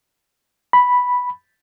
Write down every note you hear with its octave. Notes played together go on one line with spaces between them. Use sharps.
B5